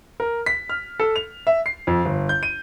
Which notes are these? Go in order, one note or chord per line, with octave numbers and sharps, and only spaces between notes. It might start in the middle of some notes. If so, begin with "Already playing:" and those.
A#4
B6
F6
A4
F7
E5
C7
F2
G1
G6
D#7